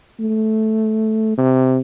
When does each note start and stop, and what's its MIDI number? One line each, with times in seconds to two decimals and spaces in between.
0.20 1.35 57
1.38 1.79 48